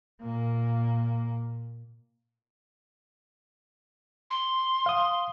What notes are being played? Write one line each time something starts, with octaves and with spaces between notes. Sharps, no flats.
A#2 A#3
C6
F5 D#6